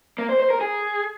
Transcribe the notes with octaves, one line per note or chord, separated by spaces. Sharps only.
A#3
C5
C5
A#4
G#4